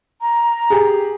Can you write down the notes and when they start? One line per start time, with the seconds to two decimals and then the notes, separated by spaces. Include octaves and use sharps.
0.21 A#5
0.70 G4 G#4